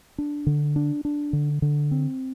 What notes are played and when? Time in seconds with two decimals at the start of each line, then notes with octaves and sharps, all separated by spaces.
0.18 D4
0.47 D3
0.76 D4
1.05 D4
1.33 D3
1.62 D3
1.91 C4